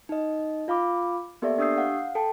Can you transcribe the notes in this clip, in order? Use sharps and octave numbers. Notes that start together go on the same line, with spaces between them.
D#4 D#5
F4 F5 B5 D6
A#3 B3 G4 A4 D5 E5
D4 G4 D#6 E6 G6 C7
F5 F#5
A4 G5 A5